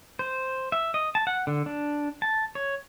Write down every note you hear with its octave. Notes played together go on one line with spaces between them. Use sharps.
C5
E5
D#5
A5
F#5
D3
D4
A5
C#5